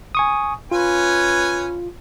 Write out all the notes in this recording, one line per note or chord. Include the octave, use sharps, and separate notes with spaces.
G#5 C#6 D#6
C#4 F4 B4 G#5